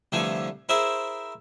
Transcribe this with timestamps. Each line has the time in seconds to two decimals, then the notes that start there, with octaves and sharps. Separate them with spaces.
0.12 C2 D3 E3 F3 A3 G#5
0.69 E4 G#4 A#4 C5 E5